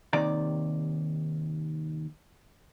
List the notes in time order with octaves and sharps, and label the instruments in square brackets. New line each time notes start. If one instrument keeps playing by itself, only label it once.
[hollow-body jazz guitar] D#2 C3 D#3 D5 A#5